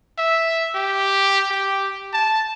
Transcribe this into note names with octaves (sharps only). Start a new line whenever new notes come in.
E5
G4
G4
A5